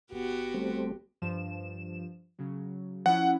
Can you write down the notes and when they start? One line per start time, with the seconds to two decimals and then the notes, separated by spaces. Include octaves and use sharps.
0.12 G1 B3 F#4 G4
0.54 G3 A3 C4
1.22 G2 F3 E7
2.39 C#3 F#3
3.06 F3 C#4 E4 F#5